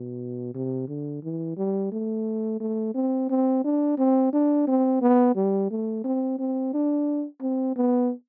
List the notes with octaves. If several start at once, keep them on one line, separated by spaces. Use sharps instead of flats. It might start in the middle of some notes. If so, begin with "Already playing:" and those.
Already playing: B2
C3
D3
E3
G3
A3
A3
C4
C4
D4
C4
D4
C4
B3
G3
A3
C4
C4
D4
C4
B3